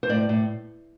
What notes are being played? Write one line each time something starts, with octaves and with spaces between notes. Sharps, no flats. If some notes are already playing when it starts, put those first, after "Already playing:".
C5
A2 D5
A2